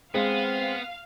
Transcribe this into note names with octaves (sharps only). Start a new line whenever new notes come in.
G#3 B3 C4 F5